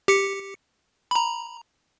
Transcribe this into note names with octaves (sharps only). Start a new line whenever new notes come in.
G4 C#7
A#5 B5